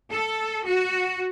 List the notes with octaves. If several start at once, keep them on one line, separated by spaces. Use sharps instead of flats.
A4
F#4